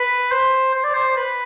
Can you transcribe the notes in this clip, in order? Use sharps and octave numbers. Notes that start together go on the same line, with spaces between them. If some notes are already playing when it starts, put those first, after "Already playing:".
Already playing: B4
C5
C5
D5
C5
B4